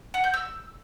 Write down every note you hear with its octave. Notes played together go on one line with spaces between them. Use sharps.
F#5
G6
E6